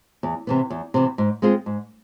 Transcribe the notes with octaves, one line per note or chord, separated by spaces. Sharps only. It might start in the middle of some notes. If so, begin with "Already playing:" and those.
E2
C3 E3 B3
E2
C3 E3 B3
G#2
G#3 C4 F4 G#4
G#2